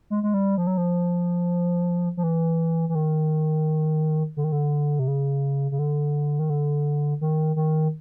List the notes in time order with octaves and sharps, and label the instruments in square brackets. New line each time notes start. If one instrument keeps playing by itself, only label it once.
[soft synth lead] G#3
G#3
G3
F3
F#3
F3
F3
E3
E3
D#3
D3
D#3
D3
C3
C#3
C#3
D3
D#3
D3
D#3
D#3